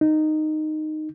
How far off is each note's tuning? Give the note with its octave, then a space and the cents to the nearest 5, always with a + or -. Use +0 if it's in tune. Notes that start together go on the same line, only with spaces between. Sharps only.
D#4 -10